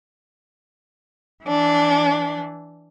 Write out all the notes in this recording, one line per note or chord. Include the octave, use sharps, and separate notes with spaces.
E3 D4